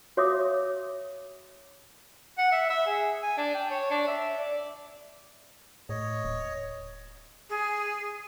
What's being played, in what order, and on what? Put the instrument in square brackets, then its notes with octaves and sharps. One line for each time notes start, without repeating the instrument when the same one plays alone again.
[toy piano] F#4 C#5 E5 F5 D6 D#6
[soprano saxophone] F#5
E5
E5
G#4
G#5
D4
G5
C#5
D4
E5
D5
[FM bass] A2 [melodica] C#5 D#5
[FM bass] D#1
[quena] G#4